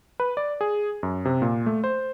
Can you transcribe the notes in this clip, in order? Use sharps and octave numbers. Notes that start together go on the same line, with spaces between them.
B4
D5
G#4
F#2
C3
A#2
A3
C5